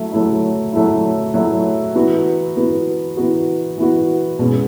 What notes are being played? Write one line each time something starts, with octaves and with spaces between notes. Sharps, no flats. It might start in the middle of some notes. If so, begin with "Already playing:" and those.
Already playing: F#3 A3 E4
F#3 A3 E4
F#3 A3 E4
F#3 A3 E4
E3 B3 F#4
E3 B3 F#4
E3 B3 F#4
E3 B3 F#4
B2 G#3 C#4